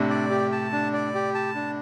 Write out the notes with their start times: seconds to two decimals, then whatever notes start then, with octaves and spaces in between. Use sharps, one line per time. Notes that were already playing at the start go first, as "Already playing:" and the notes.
Already playing: A2 C3 D4
0.10 D5
0.31 G4
0.52 A5
0.73 D4
0.93 D5
1.15 G4
1.35 A5
1.55 D4